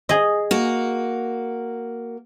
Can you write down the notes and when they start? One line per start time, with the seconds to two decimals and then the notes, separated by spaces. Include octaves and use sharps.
0.09 G#4 D#5
0.51 A#3 F#4